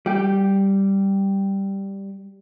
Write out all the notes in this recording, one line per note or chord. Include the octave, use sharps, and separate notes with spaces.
G3 G4